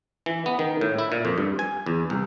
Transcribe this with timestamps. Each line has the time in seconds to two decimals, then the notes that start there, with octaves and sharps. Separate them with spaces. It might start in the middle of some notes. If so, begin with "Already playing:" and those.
0.26 E3
0.46 B3
0.59 D#3
0.81 A2
0.99 E4
1.12 A#2
1.25 F2
1.38 G2
1.59 G#5
1.86 E2
2.10 C2